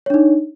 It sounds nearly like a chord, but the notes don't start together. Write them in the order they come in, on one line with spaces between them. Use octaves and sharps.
C#5 D4 D#4